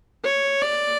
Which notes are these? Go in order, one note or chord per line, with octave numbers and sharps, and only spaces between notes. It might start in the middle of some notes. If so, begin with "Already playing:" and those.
C#5
D5